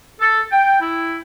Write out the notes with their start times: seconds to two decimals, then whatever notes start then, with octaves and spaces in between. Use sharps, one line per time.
0.20 A4
0.52 G5
0.80 E4